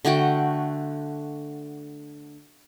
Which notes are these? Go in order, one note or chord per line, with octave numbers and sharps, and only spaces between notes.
D3 A3 F#4 G5